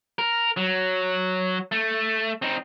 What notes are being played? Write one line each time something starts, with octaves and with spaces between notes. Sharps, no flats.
A#4
F#3
A3
C4 D#4